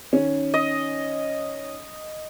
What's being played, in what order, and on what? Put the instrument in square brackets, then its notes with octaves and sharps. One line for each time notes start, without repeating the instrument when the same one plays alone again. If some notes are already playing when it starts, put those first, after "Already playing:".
[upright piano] D#3 C#4
[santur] D#5